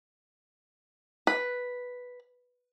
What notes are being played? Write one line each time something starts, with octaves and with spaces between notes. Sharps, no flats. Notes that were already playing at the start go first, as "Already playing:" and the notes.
B4